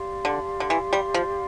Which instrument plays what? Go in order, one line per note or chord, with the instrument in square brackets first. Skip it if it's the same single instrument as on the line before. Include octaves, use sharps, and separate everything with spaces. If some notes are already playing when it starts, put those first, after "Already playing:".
Already playing: [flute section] G4 D5 F5 C6
[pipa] D3
D3
E3
G3
F3